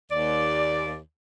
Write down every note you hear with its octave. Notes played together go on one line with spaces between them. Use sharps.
D#2 D5